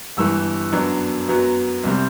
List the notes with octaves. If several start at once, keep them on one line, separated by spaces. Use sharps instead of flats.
G1 G2 E3 E6
F#2 F#3 B3 D4
F#2 F#3 B3
C2 C3 G3 C4